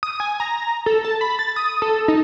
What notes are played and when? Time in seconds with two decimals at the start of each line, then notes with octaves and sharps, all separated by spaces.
0.03 D#6
0.20 G#5
0.40 A#5
0.86 A4
1.05 A5
1.21 B5
1.39 A6
1.56 D#6
1.82 A4
2.08 D#4